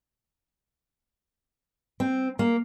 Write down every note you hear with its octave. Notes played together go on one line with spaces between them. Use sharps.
C4
A#3